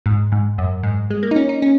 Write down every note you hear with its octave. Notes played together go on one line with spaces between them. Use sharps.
G#2
G#2
F#2
G#2
G#3
A#3
D#4
C#4
D#4
C#4